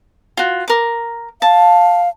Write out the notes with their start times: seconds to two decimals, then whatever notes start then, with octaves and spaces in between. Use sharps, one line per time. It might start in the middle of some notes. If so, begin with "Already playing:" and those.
0.37 F4 F#4
0.68 A#4 D6
1.42 F5 A5